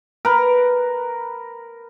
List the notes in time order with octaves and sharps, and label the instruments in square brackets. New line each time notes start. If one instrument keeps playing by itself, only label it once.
[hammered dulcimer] A#4 B4